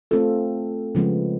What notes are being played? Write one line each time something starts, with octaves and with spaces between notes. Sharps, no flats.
A3 C4 F4 A4
C#3 F3 G#3 B3